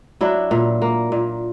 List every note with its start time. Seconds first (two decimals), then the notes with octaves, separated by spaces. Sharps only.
0.21 F#3 D4 E4
0.51 A#2
0.82 A#3
1.12 A#2